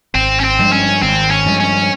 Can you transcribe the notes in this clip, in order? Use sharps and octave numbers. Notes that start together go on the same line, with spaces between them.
G#1 C4
C#4
C4
G2 F3 G#3
C#4
G#1 C4
C#4
G2 F3 G#3
C#4